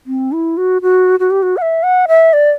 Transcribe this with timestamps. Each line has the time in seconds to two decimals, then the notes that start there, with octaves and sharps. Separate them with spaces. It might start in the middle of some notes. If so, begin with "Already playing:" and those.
0.06 C4
0.32 E4
0.57 F#4
0.82 F#4
1.20 F#4
1.31 G4
1.42 F#4
1.57 F#5
1.62 E5
1.83 F#5
2.08 E5
2.33 D5